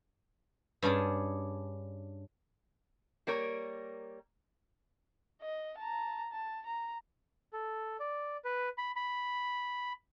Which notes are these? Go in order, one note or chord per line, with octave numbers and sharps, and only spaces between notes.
G2 C#4 D4 G#4 A5
G3 A#3 A#4 C#5
D#5
A5 A#5
A5
A#5
A4
D5
B4
B5
B5